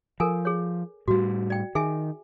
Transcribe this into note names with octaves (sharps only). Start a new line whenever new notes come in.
F3 A4 A#4 G#5
G#4 C#5
A2 G3 F#4
D5 G5
D#3 G#4 E5 G#5